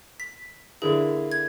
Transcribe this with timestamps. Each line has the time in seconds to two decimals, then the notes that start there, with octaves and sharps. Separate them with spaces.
0.20 B6
0.82 D3 A#3 E4 G#4
1.32 G#6